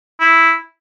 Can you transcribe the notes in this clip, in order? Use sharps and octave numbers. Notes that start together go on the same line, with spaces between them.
E4